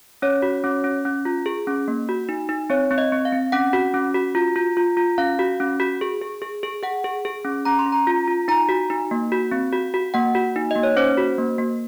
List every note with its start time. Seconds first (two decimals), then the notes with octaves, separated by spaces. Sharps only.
0.22 C#4 C#5
0.42 F#4
0.64 C#4
0.84 C#4
1.05 C#4
1.25 F4
1.46 G#4
1.67 C#4
1.88 A#3
2.09 F#4
2.29 D#4
2.49 D#4
2.70 C4 C#5
2.91 C4
2.98 D#5
3.12 C4
3.25 F5
3.32 C4
3.52 C#4 F#5
3.73 F#4
3.94 C#4
4.14 F#4
4.35 F4
4.56 F4
4.77 F4
4.97 F4
5.18 C#4 F5
5.39 F#4
5.60 C#4
5.80 F#4
6.01 G#4
6.22 G#4
6.42 G#4
6.63 G#4
6.83 G#4 F#5
7.04 G#4
7.25 G#4
7.45 C#4
7.65 C#4 A#5
7.79 C6
7.86 C#4
7.92 A#5
8.07 F4
8.28 F4
8.48 D#4 A#5
8.69 F#4
8.90 D#4
9.11 A#3
9.32 F#4
9.52 C4
9.73 F#4
9.94 F#4
10.14 A#3 F#5
10.35 F#4
10.56 D#4
10.71 A#3 D#5
10.83 C#5
10.97 C#4 C5
11.17 F#4
11.38 A#3
11.58 A#3